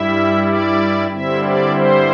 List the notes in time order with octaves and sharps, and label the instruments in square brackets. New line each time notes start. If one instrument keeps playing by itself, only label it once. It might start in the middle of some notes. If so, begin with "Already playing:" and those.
Already playing: [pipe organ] G2 G3 E4 E5
D5
G2 D3 G3 C4 E4 E5
D5
C5